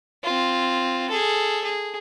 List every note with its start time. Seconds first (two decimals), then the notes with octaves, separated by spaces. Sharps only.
0.24 C4 F4
1.10 G#4 A4
1.64 G#4